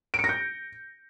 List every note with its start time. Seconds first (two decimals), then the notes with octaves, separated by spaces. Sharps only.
0.14 D7
0.19 C#7
0.24 A#6
0.29 G6